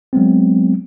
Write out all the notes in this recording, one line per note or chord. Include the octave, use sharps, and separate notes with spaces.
F#3 G#3 B3 C4